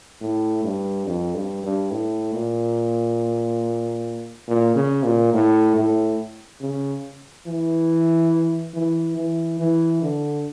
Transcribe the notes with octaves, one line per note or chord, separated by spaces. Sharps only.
A2
G2
F2
G2
G2
A2
A#2
A#2
C#3
A#2
A2
A2
C#3
E3
E3
E3
E3
D3